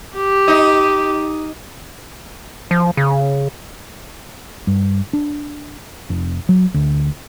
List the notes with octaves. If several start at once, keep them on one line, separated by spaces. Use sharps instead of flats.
G4
D#4
F3
C#3
G2
D4
F1
F#3
D2